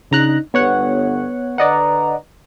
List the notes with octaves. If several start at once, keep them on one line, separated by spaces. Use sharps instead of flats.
C#3 D4 D#4 A#5 F#6
G1 B3 C#5 F#5
D3 B4 D5 D#5 F#5 A#5